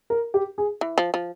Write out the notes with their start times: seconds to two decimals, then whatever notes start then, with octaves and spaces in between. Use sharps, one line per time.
0.10 A#4
0.34 G4
0.58 G#4
0.81 E3
0.98 F3
1.14 F3